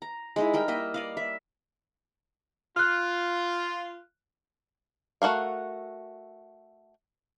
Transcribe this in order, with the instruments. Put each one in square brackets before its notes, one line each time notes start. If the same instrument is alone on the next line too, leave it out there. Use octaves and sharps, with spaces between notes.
[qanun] A#5
G#3 D#4 E4
G3 A#4 G5
A#3 D#5 E5 G5
D5 D#5 F5
E5
[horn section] F4 [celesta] F6 F#6
[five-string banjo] A3 F#4 A#4 F5